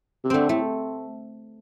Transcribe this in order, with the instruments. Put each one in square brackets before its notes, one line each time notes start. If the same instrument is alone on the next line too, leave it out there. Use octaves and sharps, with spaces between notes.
[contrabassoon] C3
[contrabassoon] D3 [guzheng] A3 C4
[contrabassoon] A2 [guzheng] A3